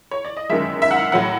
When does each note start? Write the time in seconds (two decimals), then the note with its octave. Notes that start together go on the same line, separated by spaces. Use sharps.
0.11 C#5
0.25 D5
0.37 D#5
0.49 G1 F#2 D#3 G#3 E5
0.82 E5
0.91 F#5
0.96 F5
1.12 A2 F#3 F#5